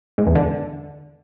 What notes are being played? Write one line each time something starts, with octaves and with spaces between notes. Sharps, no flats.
G#2
E2
D3